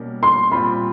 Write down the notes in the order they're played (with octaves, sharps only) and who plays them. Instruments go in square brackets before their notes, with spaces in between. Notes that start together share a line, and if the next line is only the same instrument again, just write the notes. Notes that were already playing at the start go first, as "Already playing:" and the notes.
Already playing: [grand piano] B2 G3 A#3 C#4
[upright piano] C6
[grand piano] A#2 G3 C4 F4 [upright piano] B5